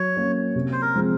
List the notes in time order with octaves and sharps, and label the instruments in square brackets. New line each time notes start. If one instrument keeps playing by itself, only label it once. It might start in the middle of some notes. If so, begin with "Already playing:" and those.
Already playing: [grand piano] F#3 [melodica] C#5
[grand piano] A#3 C#4
C3
[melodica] C5
A#4
[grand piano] F3 G#3 C4